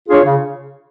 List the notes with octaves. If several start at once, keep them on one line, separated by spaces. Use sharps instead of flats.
D4 F4 G#4 C#5
C#3